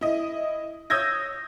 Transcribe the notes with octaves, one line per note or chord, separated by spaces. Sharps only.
E4 D#5
C#5 D#6 E6 G6 G#6 A#6